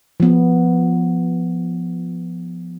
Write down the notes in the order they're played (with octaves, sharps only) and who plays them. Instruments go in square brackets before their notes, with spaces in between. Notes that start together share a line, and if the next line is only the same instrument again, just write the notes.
[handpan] F3 B3